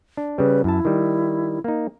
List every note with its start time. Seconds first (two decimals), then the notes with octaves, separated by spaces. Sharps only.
0.17 D4
0.38 C#3 G3 B4
0.64 F#2 E4 A5
0.85 D#3 G3
1.64 A#3 D#4